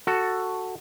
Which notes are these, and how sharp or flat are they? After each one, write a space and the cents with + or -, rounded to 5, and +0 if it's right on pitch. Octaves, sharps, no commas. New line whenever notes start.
F#4 +0 A4 +10